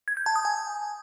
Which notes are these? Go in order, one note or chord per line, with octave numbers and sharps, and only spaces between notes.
G#6
G6
A5
D#6
G#5